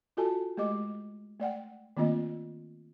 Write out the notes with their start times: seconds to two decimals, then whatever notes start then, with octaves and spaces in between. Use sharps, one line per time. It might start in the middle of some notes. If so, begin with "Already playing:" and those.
0.17 F4 F#4 A4 G#5 A5
0.57 G#3 A3 G4 D#5 D6
1.40 A3 D5 F#5 G5
1.97 D#3 A3 A#3 C4 F4 D#5